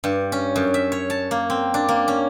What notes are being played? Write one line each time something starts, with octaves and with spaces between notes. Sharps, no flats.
G2
C#4
F#2
E5
C#5
A5
A#3
C4
D4
A#3
C#4